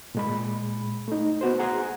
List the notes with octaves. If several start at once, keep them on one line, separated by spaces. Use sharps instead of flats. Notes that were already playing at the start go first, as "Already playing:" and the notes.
A#2 G#3 B5
A3 D#4
B3 F#4 C5
G#4 F#5 A#5